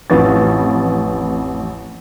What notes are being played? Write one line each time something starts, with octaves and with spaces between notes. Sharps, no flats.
A1 F2 B4 F5 A6